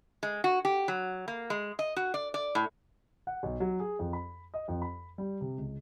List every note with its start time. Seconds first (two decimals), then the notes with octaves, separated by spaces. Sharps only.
0.23 G#3
0.44 F#4
0.65 G4
0.88 F#3
1.28 A#3
1.50 G#3
1.79 D#5
1.96 F#4
2.14 D5
2.34 D5
2.55 A2
3.27 F#5
3.43 B1
3.60 F#3
3.80 G#4
3.99 F2
4.13 B5
4.54 D#5
4.68 F2
4.82 B5
5.18 G3
5.41 C3
5.57 C#2